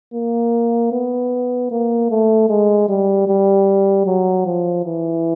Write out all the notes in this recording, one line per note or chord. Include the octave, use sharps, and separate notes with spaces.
A#3
B3
A#3
A3
G#3
G3
G3
F#3
F3
E3